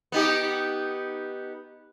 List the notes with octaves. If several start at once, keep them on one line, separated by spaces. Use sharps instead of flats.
B3 D#4 G4